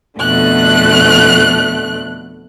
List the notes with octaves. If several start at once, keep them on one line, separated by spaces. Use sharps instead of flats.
F2 B2 D3 A3 F#6